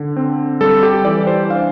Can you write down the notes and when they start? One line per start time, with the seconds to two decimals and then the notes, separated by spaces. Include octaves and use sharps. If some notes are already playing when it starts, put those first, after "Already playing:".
Already playing: D3
0.17 C4
0.61 G3 A4
0.83 G4
1.05 E3 D5
1.27 C5
1.50 D4 F5